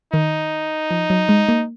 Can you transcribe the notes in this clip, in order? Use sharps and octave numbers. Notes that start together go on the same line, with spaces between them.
D#3 D#4
F3
F#3
G#3
A#3